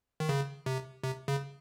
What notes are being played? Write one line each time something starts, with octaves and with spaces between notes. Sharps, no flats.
D#3
C#3
C3
C3
C#3